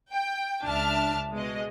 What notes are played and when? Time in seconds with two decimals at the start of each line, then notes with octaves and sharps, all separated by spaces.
0.11 G5
0.64 C#2 D4 E5 A5 F6
1.33 B2 G#3 D#5